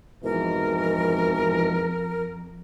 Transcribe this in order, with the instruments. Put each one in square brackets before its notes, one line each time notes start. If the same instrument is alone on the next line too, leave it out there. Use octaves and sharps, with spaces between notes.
[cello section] F2 [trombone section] G#2 B2 E3 [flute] A#4